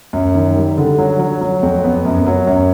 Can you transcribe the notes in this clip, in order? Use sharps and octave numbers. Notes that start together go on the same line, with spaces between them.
F#2
D#3
G3
D3
F#3
F#3
F#3
F2
B3
F#2
F#3
F#2